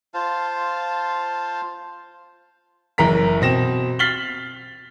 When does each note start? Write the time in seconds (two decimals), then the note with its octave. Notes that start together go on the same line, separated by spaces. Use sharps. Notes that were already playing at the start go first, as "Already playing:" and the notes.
0.14 F4 C5 F5 A5
2.98 F#1 E3 A#4 A#5 B6
3.41 B2 C4 A#6 E7
3.99 F6 A6 B6 C7 F#7 G7